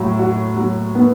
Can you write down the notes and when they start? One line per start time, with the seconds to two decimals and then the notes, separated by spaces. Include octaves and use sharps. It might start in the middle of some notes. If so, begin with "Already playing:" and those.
Already playing: A2 F#3
0.19 F#4
0.56 F#3
0.95 B3